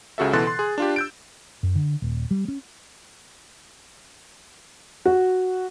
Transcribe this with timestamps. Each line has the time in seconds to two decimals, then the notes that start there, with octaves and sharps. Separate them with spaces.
0.18 C#2 C#3 F#4 A4 E5
0.33 B2 E3 A4 C6 F#6 A6
0.47 C6
0.59 G#4
0.78 D4 F4 G4
0.96 E6 G6 D7
1.63 F#2
1.75 D3
2.02 D#1
2.31 G3
2.48 C#4
5.06 F#4